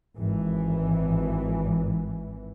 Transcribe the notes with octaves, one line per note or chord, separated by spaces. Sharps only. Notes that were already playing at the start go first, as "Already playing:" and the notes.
G#1 E3